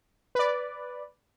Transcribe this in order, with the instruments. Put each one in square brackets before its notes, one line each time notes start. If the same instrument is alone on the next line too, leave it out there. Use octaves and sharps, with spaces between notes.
[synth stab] B4 D5